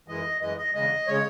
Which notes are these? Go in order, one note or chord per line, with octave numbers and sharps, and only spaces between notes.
F#2 E3 G#3 D#5
F#2 E3 G#3 D#5
D#5
E2 C#3 G#3 D#5
C#3 G#3 C#5